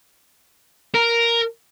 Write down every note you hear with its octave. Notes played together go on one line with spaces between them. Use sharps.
A#4